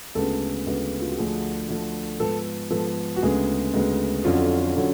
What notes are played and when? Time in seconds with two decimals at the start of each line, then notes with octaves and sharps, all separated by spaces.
0.15 D2 C#3 G#3 B3 A4
0.67 D2 C#3 G#3 B3
1.01 F4
1.10 F#4
1.17 D2 D3 F3 A3 G#4
1.69 D2 D3 F3 A3
2.20 G#2 F3 B3 A4
2.70 G#2 F3 B3 A4
3.16 F#4
3.22 D2 C#3 G#3 B3 G#4
3.74 D2 C#3 G#3 B3
4.24 F2 D3 F#3 C#4 F4
4.77 D3 F#3 C#4